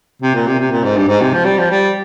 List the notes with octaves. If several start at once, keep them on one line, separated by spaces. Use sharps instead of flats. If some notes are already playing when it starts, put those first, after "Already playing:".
C3
A#2
C3
C3
A#2
G#2
G2
G#2
C3
F3
G3
F3
G3